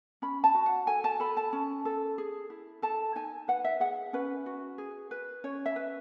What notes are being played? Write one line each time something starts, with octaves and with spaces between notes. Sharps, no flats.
C#4 B5
A5
F#4
F#5
A4 G#5
A5
A4 B5
A5
C#4
A4
G#4
E4
A4 A5
D#4 G#5
B4 F#5
E5
G#4 F#5
C#4 B4
F#4
G#4
B4
C#4 C#5
E5
B4